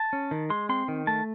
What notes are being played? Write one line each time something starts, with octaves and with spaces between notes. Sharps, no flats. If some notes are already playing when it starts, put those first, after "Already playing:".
Already playing: A5
C#4
D#3
G#3 C6
C4 C6
D#3
A3 A5